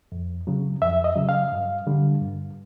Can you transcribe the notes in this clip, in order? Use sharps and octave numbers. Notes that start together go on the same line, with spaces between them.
F2
C#3 F#3
F2 E5
D#5
C#3 F#3
F5
G2
D3 G3
G2